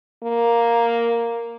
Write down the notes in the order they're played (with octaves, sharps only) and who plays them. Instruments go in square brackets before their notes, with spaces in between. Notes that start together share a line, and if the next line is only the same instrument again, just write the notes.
[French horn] A#3